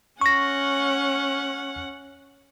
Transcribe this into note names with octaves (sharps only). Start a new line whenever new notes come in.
C#4 F#5 C#6 A#6